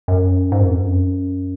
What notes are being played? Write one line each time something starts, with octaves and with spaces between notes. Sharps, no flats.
F#2
G#2
F#2
F2
F#2